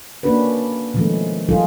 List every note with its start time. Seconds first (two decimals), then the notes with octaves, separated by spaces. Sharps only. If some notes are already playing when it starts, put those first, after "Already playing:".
0.23 A#3 C#4 D4 F#4 B4
0.94 B2 D#3 F3 G#3 A3 C#4
1.49 F3 G3 D#4 F4 G#4 A4